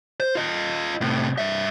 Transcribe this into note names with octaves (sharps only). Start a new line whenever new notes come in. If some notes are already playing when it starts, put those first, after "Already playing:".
C5
F4 D#5
A2 C3
G2 E5